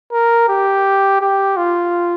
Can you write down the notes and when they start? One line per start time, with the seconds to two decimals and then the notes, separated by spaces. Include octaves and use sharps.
0.12 A#4
0.48 G4
1.21 G4
1.57 F4